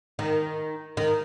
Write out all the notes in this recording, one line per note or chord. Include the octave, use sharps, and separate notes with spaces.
D#3
D#3